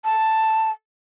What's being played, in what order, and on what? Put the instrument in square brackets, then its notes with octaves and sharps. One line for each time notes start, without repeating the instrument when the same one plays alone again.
[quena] A5